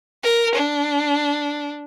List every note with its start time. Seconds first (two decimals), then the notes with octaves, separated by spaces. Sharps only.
0.24 A#4
0.55 D4